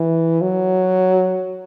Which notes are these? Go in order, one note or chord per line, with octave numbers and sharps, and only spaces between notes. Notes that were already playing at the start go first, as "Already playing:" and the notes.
Already playing: E3
F#3